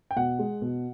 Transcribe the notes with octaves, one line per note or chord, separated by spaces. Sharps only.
G5
B2 F#5
G#3
B2